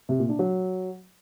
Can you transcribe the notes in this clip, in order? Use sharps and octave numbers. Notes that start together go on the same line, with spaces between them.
C3
A#2
D4
F#3